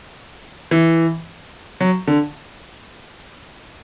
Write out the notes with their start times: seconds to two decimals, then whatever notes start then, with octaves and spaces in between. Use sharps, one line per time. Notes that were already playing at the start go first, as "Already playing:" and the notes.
0.71 E3
1.81 F#3
2.07 D3